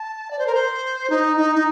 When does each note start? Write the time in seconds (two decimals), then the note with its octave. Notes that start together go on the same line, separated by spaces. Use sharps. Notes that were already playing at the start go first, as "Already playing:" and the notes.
Already playing: A5
0.31 D5
0.39 C5
0.47 A#4
0.55 C5
1.10 D#4
1.37 D#4
1.55 D#4